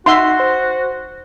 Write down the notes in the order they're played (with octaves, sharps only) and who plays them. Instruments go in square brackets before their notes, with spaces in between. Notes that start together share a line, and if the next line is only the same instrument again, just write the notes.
[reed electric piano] D#4 F#5 [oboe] F#4 [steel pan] E5 C6
[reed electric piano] C5